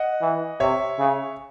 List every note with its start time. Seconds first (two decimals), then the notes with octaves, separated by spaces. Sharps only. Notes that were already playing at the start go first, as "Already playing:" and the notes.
Already playing: D#5 F#5
0.21 E3
0.60 C3 C#5 E5
0.99 C#3